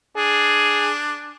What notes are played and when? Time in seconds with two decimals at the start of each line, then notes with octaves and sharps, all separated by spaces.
0.17 D4 G#4